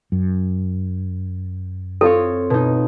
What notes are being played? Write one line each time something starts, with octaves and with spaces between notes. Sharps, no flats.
F#2
C4 F4 A4 C#5
B2 D#4